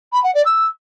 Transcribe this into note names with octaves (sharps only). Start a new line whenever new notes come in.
B5
F#5
D5
E6